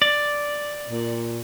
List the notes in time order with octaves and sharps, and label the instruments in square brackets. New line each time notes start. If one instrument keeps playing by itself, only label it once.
[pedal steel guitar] D5
[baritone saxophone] A#2